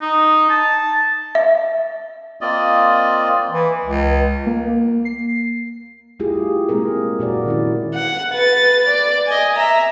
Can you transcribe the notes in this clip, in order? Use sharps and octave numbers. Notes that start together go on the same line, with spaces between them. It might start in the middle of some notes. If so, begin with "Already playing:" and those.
D#4
A5
E5
A#3 C4 F4 D5 D#5
E3
C#2
A#3
C7
G3 A3 E4 F4 G4 G#4
G#3 A#3 C4 G#4 A#4
A#2 F#4 A#4 D5
D#3 C#4 E4
F#5
B4 A6
D5
D#5 G#5
E5 A#5